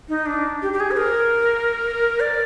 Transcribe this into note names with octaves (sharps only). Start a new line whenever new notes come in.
D#4
D4
G4
G4
G#4
C5
A#4
D5